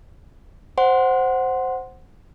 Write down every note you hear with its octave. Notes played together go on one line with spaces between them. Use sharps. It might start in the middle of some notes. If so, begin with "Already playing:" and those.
C5 F#5 C6